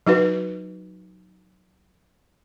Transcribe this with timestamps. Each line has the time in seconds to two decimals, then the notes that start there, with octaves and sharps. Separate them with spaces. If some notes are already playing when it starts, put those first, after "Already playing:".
0.07 F#3 D#4 F#4 B4